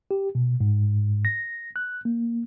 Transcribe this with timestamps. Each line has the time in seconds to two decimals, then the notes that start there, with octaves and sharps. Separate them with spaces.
0.11 G4
0.35 B2
0.61 G#2
1.25 A#6
1.76 F#6
2.05 A#3